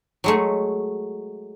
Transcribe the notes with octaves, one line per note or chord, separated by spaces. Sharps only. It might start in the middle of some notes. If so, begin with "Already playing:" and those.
F#3 G#3 A3